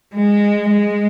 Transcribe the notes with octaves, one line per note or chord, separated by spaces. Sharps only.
G#3
G#3